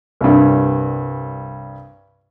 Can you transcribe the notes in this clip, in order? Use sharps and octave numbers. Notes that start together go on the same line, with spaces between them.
C2 G2